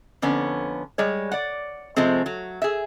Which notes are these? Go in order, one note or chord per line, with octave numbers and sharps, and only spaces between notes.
F2 D3 B3 C#4
G3 G#3 C#5
D5 F#5
C3 F3 G#3 A3 C4
F#3
G#4 E5